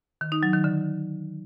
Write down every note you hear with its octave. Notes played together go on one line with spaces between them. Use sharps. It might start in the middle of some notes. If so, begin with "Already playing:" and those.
D#3
D#4
F#3
D#3
D3